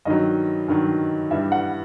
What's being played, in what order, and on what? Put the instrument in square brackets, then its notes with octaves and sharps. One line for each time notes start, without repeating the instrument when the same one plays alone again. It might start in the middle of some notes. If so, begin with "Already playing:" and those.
[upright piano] G2 D#3 F#3 D#5
G2 D#3 F#3
G2 E3 G3 E5
F#5